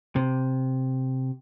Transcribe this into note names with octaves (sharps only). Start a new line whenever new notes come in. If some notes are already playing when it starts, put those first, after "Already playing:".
C3